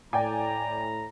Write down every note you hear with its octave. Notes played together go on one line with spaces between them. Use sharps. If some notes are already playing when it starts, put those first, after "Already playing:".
A2 D5 G5 G#5 A#5